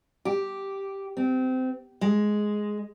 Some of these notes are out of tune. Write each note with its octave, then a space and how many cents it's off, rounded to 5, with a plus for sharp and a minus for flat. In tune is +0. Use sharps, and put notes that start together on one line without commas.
G4 -5
C4 -25
G#3 +5